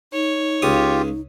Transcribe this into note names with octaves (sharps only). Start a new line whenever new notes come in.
D#4 C#5
C#2 F4 G4 D#6